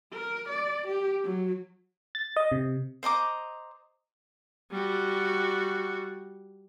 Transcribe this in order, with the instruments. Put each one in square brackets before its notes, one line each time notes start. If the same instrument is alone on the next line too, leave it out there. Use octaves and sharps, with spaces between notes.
[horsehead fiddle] A#4
D5
G4
F#3
[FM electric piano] A6
D#5
C3
[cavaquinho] C5 D#5 A#5 D6
[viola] G3 F#4